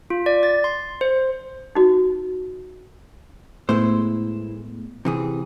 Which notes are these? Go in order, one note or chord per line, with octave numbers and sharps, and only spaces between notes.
F4
D5
A6
C6
C5
D#4 F#4
A2 G#3 A3 B3 E4 C5
C3 E3 G#4